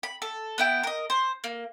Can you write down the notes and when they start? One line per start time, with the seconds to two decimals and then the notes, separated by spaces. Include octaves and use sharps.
0.03 B5
0.22 A4
0.58 B3 E4 G5
0.83 A#4 D#5
1.10 C5
1.44 A#3